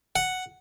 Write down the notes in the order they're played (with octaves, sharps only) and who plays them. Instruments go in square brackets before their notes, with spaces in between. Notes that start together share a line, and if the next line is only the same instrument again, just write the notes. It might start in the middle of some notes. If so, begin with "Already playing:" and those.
[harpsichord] F#5